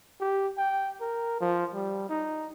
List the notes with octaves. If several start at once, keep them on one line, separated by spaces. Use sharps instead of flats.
G4
G5
A#4
F3
G3
D#4